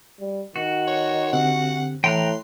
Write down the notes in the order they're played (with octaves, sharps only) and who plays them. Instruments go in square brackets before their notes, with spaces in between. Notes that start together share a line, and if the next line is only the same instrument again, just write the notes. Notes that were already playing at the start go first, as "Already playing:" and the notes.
[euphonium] G3
[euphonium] D#3 [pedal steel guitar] F#4
[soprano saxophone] C#5
[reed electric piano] D3 C4 G4 [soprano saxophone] F#5
[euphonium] A2 [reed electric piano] E3 [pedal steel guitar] G5 A#5 F#6 [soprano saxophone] C6